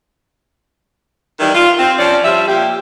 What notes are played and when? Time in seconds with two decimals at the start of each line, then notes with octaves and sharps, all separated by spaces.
1.40 D#3 E3 G3
1.55 F4
1.78 C4
1.98 F3 C#4 D5
2.24 F3 G3 E5
2.47 A#2 G4